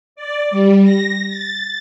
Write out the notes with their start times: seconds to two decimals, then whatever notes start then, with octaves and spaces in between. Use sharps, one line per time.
0.16 D5
0.51 G3
0.84 A#6
1.28 A6